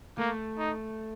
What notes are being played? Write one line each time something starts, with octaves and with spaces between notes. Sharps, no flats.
A3 A#3
D#4